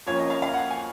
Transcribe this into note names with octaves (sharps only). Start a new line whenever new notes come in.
F2 F3 A#3 C#4 F4 C#5
D#5
F5
F5
F#5
G#5